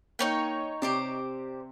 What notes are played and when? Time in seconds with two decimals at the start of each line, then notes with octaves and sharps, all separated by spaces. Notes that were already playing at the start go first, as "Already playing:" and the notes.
0.19 A#3 D#4 C#5 G5
0.82 C3 G4 C5 D5